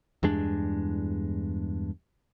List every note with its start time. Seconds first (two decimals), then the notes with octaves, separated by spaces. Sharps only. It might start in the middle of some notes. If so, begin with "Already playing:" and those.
0.23 E2 G2 G#3 D4